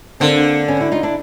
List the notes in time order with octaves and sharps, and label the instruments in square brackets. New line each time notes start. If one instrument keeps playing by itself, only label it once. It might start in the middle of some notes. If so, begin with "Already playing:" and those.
[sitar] D3 [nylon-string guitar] A#3 C4
[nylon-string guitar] B3 C#4
E4 F#4
D#4 F4
D4 E4